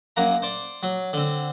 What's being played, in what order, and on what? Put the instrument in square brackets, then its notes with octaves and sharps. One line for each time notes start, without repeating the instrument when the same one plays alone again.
[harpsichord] F#2 A#3 F#5 A#5
C5 D5
F#3
D3 C4